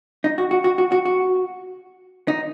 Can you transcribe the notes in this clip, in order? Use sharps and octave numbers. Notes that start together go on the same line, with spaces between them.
D#4
F#4
F#4
F#4
F#4
F#4
F#4
D#4